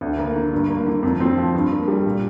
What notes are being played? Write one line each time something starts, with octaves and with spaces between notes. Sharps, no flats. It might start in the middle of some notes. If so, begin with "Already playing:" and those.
D2
A#3
D3
G2
A#3
D3
F2
C4
F3
G2
A#3
G3
A#2